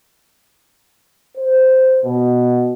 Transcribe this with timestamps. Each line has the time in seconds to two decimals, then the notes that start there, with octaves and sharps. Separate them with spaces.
1.37 C5
2.04 B2